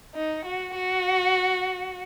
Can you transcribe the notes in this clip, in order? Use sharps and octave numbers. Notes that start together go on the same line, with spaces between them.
D#4
F#4
F#4